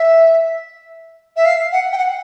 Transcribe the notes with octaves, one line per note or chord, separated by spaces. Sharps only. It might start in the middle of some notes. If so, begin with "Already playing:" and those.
Already playing: E5
E5
F5
F#5
G5
F#5